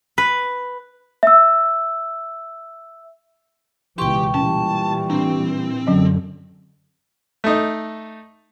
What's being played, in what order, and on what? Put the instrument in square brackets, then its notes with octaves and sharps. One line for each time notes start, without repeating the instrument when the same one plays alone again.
[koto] B4
[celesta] E5 E6
[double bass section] C#2 B2 E3 [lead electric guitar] G4 [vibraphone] G5 C#6 [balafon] C6
[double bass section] A#2 E3 G3 [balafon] C#4 [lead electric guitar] A5
[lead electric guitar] C4 [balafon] D4
[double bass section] F#2 D3 [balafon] F#3 C#4 D#5
[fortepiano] A3 D#4